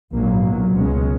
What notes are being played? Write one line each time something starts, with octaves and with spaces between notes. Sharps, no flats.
A#1 G#2 F#3 A#3
B1 A#2 F#3
C#2 B2 G#3 C#4